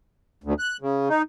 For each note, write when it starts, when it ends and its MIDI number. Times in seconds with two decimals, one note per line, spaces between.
0.44 0.54 38
0.59 0.77 90
0.81 1.09 49
1.09 1.22 63